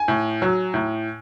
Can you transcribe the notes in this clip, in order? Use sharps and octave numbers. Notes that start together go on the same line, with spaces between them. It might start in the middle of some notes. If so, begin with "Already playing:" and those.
Already playing: G#5
A2
F#3
A2